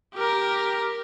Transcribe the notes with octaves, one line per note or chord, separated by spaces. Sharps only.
G4 A#4